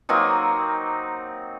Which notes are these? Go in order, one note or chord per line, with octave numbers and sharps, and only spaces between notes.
F#3 A#3 C4 D#4